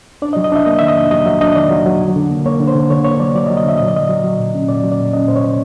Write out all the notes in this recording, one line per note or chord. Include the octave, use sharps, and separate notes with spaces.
D4 D5
D#5
F#3
D#5
D4 E5
A#3 D#5
D#3 E5
D#5
D4
F#3 D#5
F#3 E5
D4 D#5
D#3 D5
F#3
F#3
D3
D3
A#3
A#3 C#5
D3
C5
D3
D3 C#5
A#3 C#5
F#3 D5
F#3 D5
D#5
F#3
D#5
D3 E5
A#2 D#5
D5
F#3 D#5
F#3
F#3
A#2
C#4
A#2 D5
F#3
D5
A#2
C#4 D#5
A#2 C5
C#5
A#3